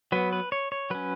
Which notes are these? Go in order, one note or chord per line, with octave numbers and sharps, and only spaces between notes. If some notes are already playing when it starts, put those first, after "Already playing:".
F#3 B3 B4
B4
C#5
C#5
F#3 C#4 B4